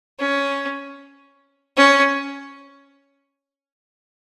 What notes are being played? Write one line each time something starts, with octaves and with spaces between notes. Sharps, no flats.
C#4
C#4